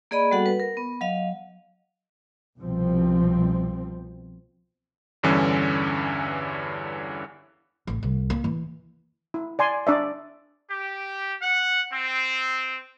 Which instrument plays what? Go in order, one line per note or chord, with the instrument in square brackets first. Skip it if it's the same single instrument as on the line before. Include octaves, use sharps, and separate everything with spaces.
[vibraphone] A#3 G#4 D5 D#5 B5
G3 B3 F#4 A4 F#5
B4
A#4
B3
F#3 D#5 F5
[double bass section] C2 B2 F3 C4
[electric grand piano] E2 G2 D3 E3 C#4
[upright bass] A1
C2
A#3
E3
[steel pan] E4
D5 G#5 C6
D4 D5 E5
[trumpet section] G4
F#5
C4